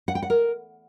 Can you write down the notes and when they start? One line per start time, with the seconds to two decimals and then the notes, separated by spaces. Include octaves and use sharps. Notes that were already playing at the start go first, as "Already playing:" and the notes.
0.08 F#5
0.15 G5
0.22 F#5
0.30 A#4